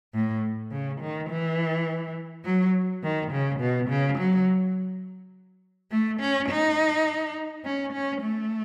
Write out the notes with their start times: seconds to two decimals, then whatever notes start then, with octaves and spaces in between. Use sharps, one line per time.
0.15 A2
0.71 C#3
1.00 D#3
1.30 E3
2.45 F#3
3.03 D#3
3.32 C#3
3.60 B2
3.89 C#3
4.18 F#3
5.91 A3
6.20 C#4
6.49 D#4
7.64 C#4
7.93 C#4
8.22 A3